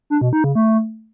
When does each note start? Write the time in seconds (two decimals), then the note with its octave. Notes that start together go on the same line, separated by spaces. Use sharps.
0.10 D4
0.21 B2
0.33 D#4
0.44 C#3
0.55 A3